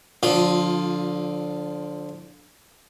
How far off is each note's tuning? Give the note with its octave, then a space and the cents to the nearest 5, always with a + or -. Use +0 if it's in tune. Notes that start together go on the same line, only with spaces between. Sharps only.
D3 +0 F3 +30 F4 +0